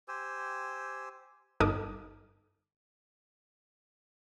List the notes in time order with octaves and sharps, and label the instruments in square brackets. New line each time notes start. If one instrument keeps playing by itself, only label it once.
[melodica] G4 C5 G#5 E6
[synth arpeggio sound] G1 D#4 A4 A#4 D6 D#6